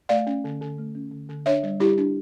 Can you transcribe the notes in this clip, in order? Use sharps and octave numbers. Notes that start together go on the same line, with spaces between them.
A3 D5 F5
C#4
D3
D3
A3
C#4
D3
D3
D4 C#5 E5
G3
G3 E4 G4
D4